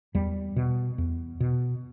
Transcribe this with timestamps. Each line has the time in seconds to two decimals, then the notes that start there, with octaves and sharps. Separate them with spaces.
0.14 E2 G3
0.56 B2
0.98 E2
1.40 B2